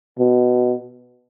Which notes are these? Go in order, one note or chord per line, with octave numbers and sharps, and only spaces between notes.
B2